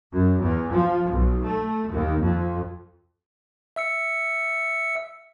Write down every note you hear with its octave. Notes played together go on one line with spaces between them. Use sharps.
F#2
E2
F3
B1
A3
D#2
F2
E5 E6 C#7